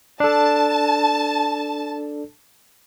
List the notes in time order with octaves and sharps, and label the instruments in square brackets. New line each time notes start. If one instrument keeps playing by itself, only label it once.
[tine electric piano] D4 A4 [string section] A5